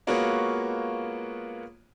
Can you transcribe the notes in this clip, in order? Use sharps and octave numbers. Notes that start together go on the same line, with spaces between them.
G#3 A#3 B3 F4 F#4 C#5